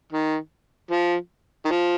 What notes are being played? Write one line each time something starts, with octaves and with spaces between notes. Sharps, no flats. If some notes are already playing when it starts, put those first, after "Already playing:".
D#3
F3
D#3
F3